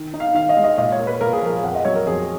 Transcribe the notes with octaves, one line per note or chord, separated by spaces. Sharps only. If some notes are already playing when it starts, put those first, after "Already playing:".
Already playing: D#3
D#4
F5
D#3 F5
D#5
G#3
D#5
A#2 D#5
C#5
A#3
B4
A#2 A#4
G#4
F3 A#4
F2 F#5
D#5
F#3 C#5
A#4
F2 G#4